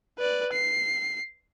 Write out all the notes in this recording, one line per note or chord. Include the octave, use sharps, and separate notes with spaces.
B4 D5
C7